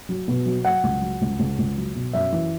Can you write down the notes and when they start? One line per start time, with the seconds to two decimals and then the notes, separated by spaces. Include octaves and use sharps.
0.09 F#3
0.28 B2
0.46 F#3
0.65 F#3 F#5
0.83 C#2
1.01 F#3
1.21 C#2
1.39 C#2
1.58 C#2
1.77 F#3
1.95 B2
2.13 F#2 E5
2.32 E3